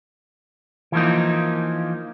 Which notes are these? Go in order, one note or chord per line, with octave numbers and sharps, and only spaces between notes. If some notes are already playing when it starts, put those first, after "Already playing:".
E3 F3 A#3 D#4